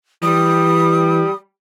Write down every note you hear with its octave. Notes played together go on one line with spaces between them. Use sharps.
E3 G3 D#6